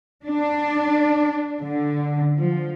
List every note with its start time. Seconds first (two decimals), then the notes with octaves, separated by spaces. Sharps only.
0.24 D4
1.61 D3
2.37 F3